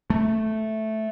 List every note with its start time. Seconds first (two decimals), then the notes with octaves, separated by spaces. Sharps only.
0.10 A3